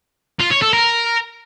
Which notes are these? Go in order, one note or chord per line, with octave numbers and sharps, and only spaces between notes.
F4
C#5
A4
A#4